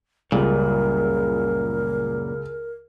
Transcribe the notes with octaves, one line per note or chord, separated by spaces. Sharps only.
C#2 F#2 A#2 G3 A#4